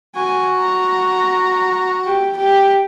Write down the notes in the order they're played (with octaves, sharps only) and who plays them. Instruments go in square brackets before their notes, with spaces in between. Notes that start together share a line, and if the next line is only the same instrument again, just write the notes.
[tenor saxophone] F#4 [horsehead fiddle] G#5
[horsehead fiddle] A#5
G4
G4